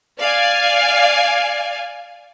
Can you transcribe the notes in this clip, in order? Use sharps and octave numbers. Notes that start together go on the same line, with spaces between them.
D5 F5 G#5